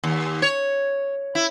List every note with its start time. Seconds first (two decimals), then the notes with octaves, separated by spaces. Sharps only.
0.04 D#2
0.42 C#5
1.35 E4